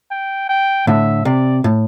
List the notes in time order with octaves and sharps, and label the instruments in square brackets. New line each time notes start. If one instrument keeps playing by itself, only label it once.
[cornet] G5
G5
[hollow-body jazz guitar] A2 D3 [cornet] E5
[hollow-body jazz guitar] C3 [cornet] D5
[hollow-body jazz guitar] A2